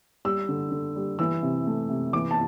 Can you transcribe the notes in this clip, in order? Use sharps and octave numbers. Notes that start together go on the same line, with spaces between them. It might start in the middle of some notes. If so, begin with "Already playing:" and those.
G3 E6
D3
D3
G3
E3 E6
C3
A3
C3
E3 D6
A5